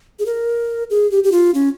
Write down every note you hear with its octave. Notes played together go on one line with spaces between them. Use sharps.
G#4
A#4
G#4
G4
G4
F4
C#4